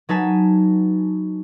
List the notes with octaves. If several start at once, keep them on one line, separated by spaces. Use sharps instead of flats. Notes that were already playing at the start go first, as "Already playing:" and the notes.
F#3 D#4 B4 G#5 A5 B6